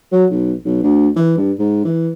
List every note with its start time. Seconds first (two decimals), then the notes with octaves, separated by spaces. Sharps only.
0.12 F#3
0.31 B1
0.65 B1
0.83 D2
1.16 E3
1.38 G2
1.59 G#2
1.85 E3